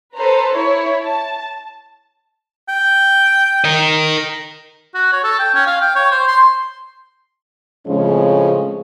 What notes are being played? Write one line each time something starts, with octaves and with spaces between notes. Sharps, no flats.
A4 B4 C5 A#5
E4 C#5
A5
G5
A#4 D#5
F#4
C#5
A4
G5
C#4
F5
G5
C#5
C5
C6
A2 C#3 F3 G#3 C4 C#4